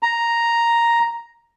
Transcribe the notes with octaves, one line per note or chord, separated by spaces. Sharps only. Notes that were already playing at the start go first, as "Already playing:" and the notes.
A#5